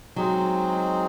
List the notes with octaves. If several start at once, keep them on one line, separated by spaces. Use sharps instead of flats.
F#3 G#3 C4 D#4 G#4 C5